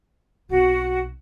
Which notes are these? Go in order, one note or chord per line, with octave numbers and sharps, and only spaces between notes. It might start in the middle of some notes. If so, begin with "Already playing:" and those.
B1 C4 F#4